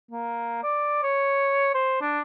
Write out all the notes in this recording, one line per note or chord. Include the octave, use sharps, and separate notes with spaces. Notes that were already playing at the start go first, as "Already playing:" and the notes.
A#3
D5
C#5
C5
D4